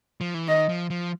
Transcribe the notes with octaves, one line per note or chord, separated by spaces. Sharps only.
F3
E3
D#3 D#5
F3
F3